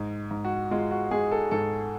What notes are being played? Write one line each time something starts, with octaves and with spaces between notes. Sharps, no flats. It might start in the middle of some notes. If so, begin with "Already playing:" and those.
Already playing: G#2
G#2
F#4
G#3 F4
F#4
G#3 G#4
A4
G#2 A4